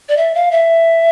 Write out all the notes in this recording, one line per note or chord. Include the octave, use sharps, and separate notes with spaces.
D5
E5
F5
E5